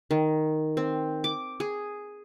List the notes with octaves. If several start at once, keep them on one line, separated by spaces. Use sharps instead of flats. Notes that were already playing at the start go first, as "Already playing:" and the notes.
D#3
C4
D6
G#4